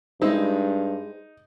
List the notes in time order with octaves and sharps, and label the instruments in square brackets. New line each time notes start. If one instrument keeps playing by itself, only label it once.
[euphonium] G2 [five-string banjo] G#3 C4 E4 [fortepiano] D#4